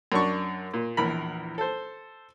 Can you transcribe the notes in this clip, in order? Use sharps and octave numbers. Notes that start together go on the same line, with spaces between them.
F#2 D4 C#6
A#2
A#1 E2 A#4 B5
A4 C5